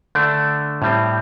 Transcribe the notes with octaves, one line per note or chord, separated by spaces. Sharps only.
D3 A3 D4
A2 G3 C4